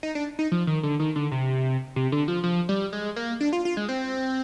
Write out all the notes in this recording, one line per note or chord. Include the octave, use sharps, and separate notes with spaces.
D#4
D4
D#4
F3
D#3
D3
D#3
D3
C3
C3
D3
F3
F3
G3
G#3
A#3
D4
F4
F4
G#3
C4